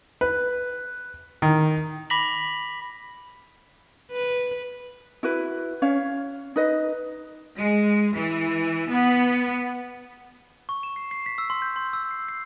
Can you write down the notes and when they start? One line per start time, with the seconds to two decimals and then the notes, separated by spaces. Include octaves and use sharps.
0.21 B4
1.42 D#3
2.10 B5 D6 A#6 B6 F#7
4.11 B4
5.23 E4 F#4 B4
5.82 C#4 C#5 F5
6.56 D#4 B4 D#5
7.57 G#3
8.16 E3
8.91 B3
10.69 C#6
10.83 E7
10.96 C7
11.11 C7
11.26 B6
11.38 E6
11.50 C6
11.62 G6
11.76 C6
11.93 E6
12.11 C7
12.28 C7